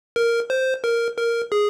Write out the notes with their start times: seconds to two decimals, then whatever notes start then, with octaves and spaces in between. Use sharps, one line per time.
0.16 A#4
0.50 C5
0.84 A#4
1.17 A#4
1.52 G#4